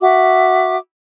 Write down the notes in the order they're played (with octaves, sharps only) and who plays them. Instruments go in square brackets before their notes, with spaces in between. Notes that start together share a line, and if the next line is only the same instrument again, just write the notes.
[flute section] F#4 E5 D6